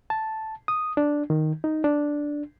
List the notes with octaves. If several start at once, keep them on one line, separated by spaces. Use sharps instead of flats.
A5
D#6
D4
D#3
D#4
D4